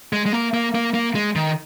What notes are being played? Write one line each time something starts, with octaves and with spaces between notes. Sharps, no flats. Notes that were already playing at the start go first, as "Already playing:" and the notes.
G#3
G#3
A#3
A#3
A#3
A#3
G#3
D#3